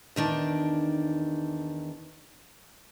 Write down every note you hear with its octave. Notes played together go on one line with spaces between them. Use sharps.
E2 D#3 D4